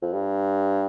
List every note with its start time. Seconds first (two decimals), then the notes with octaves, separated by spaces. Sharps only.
0.02 F2
0.13 G2